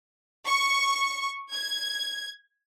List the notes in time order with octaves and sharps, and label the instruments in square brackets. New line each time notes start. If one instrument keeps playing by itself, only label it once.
[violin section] C#6
G#6